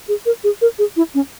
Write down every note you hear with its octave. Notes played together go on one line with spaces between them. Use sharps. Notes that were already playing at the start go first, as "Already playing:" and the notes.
G#4
A#4
G#4
A#4
G#4
E4
C#4